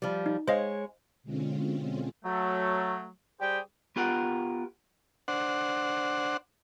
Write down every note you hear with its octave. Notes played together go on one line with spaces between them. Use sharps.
F3 G3
D#4
G#3 C5 C#5 D#5 F5
B2 D3 G#3 C4 C#4 F4
F#3 A3
G3 G4 G#4 C5 G5
B3 F4 G4 A#4 F#5
D4 C5 F#5